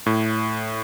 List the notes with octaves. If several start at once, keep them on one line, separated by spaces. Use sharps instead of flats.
A2